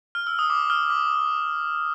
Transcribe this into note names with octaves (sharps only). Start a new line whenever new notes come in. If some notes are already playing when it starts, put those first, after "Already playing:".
F6
E6
D#6
D6
F6
D6